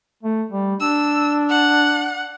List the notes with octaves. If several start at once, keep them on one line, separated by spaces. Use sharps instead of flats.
A3
G3
D4 E6
F#5